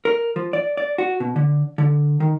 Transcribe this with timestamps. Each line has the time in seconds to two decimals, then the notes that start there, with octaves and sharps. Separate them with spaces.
0.05 A#4
0.36 F3
0.53 D5
0.77 D5
0.98 F#4
1.20 B2
1.36 D3
1.78 D3
2.20 D#3